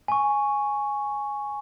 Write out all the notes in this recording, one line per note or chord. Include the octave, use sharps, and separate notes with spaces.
G#5 C#6